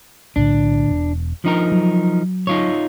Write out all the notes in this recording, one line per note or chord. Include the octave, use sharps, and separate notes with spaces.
B1 A2 D3 D4
E1
F3 D4 D#4 A#4
F#3
D#4 F4 C#5